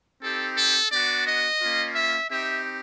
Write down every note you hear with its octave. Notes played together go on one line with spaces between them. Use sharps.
C4 D#4 G4 A4
A4
B3 D4 F#4 D5
D#5
A#3 C#4 F4
E5
C4 D#4 G4 E5